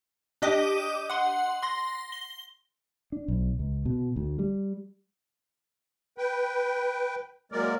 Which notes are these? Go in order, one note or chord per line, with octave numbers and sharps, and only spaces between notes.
D4 G4 D#5 D6 D#6
F#5 C6
C6 A#6
G7
D4
B1
C#2
B2
D2
G3
B4 G5
F#3 G#3 A#3 A#4 D5